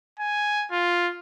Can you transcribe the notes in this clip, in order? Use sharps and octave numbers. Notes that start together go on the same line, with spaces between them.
G#5
F4